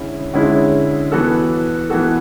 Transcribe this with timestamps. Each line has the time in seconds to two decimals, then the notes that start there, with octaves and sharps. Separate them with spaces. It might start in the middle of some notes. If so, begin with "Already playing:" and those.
Already playing: D3 G#3 C#4 E4
0.34 D3 G#3 C#4 E4
1.12 E3 B3 F#4 A4
1.90 E3 B3 F#4 A4